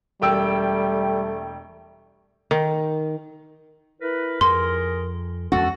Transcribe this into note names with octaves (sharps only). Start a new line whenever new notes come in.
E1 G3 A3 G5 E6
D#3
E4 A#4 B4
F2 G#4 A#4 C6
E2 G#3 C#4 F#4 A4